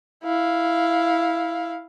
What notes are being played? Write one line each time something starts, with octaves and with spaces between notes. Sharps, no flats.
E4 F5